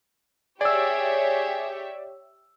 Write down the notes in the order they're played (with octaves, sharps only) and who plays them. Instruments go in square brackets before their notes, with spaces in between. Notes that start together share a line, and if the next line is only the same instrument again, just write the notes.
[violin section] G4 C#5 E5 [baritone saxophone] G#4 [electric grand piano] D5 E6